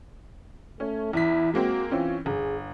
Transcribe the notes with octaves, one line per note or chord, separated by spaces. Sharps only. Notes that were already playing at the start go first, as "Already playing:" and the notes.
A3 C#4
E2 E4 B6
G#3 A#3 C4 F#4
E3 C4 C#4 F4
G1 G#4